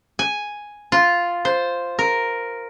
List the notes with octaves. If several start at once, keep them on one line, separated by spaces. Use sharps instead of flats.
G#5
F4
C5
A#4